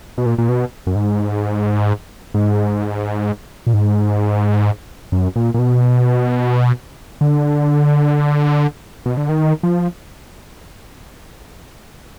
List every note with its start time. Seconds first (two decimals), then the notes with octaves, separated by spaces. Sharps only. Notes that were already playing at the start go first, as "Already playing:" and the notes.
0.18 B2
0.26 A#2
0.38 A#2
0.49 B2
0.87 F#2
0.96 G#2
2.34 G#2
3.67 A#2
3.73 G#2
5.12 F#2
5.36 A#2
5.54 A#2
5.59 B2
7.21 D3
9.06 B2
9.17 D3
9.29 D#3
9.63 F3